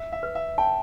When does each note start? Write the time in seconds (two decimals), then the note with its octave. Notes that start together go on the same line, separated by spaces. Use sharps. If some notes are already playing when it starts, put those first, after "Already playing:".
Already playing: E5
0.12 E5
0.23 B4
0.35 E5
0.58 G5 A5